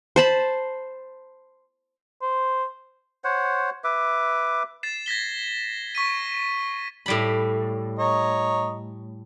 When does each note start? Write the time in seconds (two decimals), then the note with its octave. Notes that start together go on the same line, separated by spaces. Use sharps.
0.16 C5 A5 B5
2.22 C5
3.24 C5 C#5 F#5
3.84 B4 E5 D6
4.83 A6 C7 E7
5.06 G#6 A#6 B6 G7
5.95 C#6 B6 D#7
7.06 A2 G3 B5
7.99 C#5 D#5 A#5